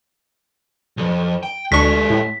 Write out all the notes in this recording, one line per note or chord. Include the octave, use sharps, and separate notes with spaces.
B1 F2
G5
D2 G#3 D4 A4 C#6 B6
A2